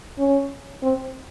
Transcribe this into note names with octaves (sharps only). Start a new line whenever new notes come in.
C#4
C4